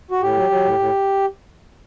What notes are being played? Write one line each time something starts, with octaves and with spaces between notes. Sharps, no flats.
F#4
A2 G4
F#3
F#3
A2
A2